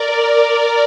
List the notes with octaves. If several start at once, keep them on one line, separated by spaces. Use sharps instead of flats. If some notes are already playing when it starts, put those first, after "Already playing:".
Already playing: A#4 D5